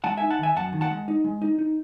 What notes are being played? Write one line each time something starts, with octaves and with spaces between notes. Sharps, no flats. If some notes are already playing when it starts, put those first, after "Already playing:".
G#3 F#5 A5
D#4 E5 G#5
F#5 A5
D#3 E5 G#5
F#2 F#5 A5
D#3
F#5 A5
G#3
D#4
G#3
D#4
D#4